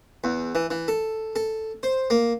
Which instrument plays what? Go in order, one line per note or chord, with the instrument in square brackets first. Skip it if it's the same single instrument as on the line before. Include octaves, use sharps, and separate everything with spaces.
[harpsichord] E2
E3
E3
A4
A4
C5
A#3